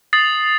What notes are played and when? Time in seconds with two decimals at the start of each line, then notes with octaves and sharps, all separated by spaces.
0.13 D#6 A6 C7 F#7